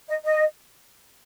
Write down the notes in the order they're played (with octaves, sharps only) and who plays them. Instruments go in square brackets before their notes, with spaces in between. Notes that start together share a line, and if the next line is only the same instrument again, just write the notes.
[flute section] D#5
D#5